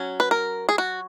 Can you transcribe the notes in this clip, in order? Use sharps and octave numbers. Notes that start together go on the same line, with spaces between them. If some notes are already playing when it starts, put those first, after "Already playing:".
Already playing: F#3 C#4
B4
A#4
G#4
F#4